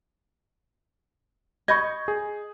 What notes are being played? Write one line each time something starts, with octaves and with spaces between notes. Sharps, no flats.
D#5 B5 C#6 G6 G#6
G#4